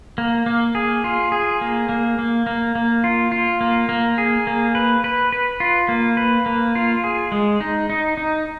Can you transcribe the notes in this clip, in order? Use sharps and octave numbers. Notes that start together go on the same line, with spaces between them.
A#3
A#3
G#4
F4
G#4
A#3
A#3
A#3
A#3
A#3
F4
F4
A#3
A#3
G#4
A#3
B4
B4
B4
F4
A#3
B4
A#3
F4
G#4
G#3
D#4
D#4
D#4